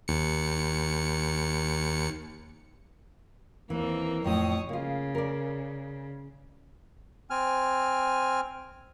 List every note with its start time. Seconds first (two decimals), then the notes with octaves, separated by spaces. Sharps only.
0.08 D#2 C#7
3.70 D#2 E3 A#3 C4
4.24 F2 A2 F3 C#5 D#6
4.69 C#3 A#3 F4
5.15 A#4 D5
7.30 C4 G#5 F6